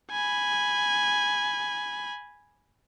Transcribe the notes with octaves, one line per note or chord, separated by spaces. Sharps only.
G#5 B5